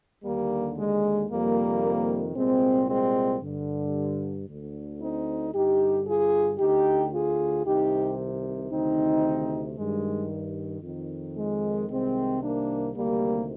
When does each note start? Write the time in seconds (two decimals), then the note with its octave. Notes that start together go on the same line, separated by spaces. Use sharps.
0.23 D#2 D3 G3 A#3
0.76 G#3
1.29 F2 C3 D#3 G3 A#3
2.35 C2 A#2 G#3 C4
2.88 G#3 C4
3.41 G2 D3
4.48 D2 D3
5.00 C4 D#4
5.53 G2 D3 D#4 G4
6.05 F4 G#4
6.59 D2 D3 D#4 G4
7.12 F4 G#4
7.65 C2 C3 D#3 D#4 G4
8.71 D2 C3 D#3 C4 D#4
9.76 G2 D#3 G#3
10.82 F2 D#3
11.36 G#3
11.88 C2 C3 D#3 G#3 C4
12.41 A#3 D4
12.95 D2 C3 D#3 G3 A#3